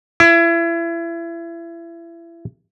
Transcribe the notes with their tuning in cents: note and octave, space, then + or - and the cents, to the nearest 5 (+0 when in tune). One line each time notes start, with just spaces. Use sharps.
E4 +30